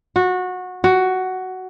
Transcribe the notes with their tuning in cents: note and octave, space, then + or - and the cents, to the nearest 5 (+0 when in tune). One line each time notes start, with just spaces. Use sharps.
F#4 -20
F#4 +10